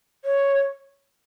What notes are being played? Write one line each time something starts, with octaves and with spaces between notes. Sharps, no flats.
C#5